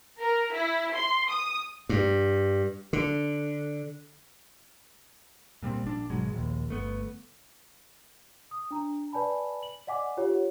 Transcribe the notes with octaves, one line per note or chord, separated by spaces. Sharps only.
A#4
E4
C6
D#6
G2
D3
A#2 G3 A#3 C4
A#1 D4
G#1 B2 F#3 G#3
A#1 D#2
G1 A3 B3
D#6
D4 A#5
B4 D5 G#5 A5 B5
F#7
D5 D#5 F#5 G#5 D6
F4 G4 C#5 F#5